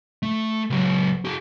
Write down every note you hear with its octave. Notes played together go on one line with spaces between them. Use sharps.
A3
C#2 F#3
F#4 G#4